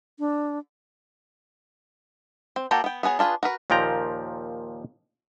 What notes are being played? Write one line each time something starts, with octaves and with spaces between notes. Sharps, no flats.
D4
C4
A#3 F#4 G4 A4 D5
B3 G5
B3 F#4 G#4 C#5
D4 F4 G#4 B4
F#4 A#4 B4
D#2 A#2 F3 G5 A#5